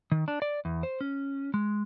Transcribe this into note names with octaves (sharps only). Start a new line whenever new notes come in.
D#3
D4
D5
E2
C5
C#4
G#3